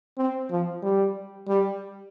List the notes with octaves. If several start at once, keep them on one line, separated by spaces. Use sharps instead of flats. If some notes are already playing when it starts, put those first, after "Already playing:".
C4
F3
G3
G3